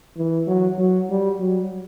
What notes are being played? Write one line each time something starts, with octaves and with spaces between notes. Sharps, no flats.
E3
F#3
F#3
G3
F#3